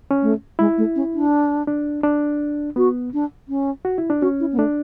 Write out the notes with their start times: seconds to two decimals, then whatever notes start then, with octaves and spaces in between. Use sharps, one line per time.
0.11 C#4
0.22 A3
0.59 G#3 E4
0.78 A3
0.96 C#4
1.14 D4
1.67 D4
2.04 D4
2.76 B3 F#4
3.14 D4
3.49 C#4
3.85 F#4
3.98 E4
4.10 D4
4.21 C#4 F#4
4.40 E4
4.53 B3
4.58 A3 D4